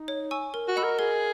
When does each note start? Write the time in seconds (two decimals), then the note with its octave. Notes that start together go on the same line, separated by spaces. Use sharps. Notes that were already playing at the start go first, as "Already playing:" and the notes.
Already playing: D#4
0.08 C#5
0.31 G#5 C#6 E6
0.54 A#4
0.68 F#4
0.76 D#5 F#5 B5 E6
0.84 A#4
0.99 G#4 A#4